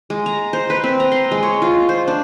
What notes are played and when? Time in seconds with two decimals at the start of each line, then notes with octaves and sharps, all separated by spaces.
0.10 G#3
0.26 A#5
0.53 C5
0.70 B4
0.83 C4
1.00 A#5
1.12 C6
1.31 G#3
1.43 C#5
1.62 F4
1.89 C5
2.08 D4